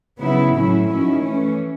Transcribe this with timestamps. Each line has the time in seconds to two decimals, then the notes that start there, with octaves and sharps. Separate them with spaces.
0.19 C#3 F#3 B3 E4
0.54 A2 F#3 C#4 E4
0.88 D#3 F#3 C#4 E4
1.23 E3 A3 C#4